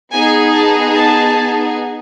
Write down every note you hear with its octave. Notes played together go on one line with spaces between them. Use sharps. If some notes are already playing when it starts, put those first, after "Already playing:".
B3 D#4 G#4 G#5
A5
A5